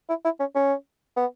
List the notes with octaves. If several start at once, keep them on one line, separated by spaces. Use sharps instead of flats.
E4
E4
C#4
C#4
B3